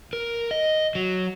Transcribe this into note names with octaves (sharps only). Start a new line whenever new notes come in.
A#4
D#5
F#3